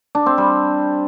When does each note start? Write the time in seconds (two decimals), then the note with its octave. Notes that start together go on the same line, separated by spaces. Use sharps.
0.15 D4
0.26 C4
0.38 G3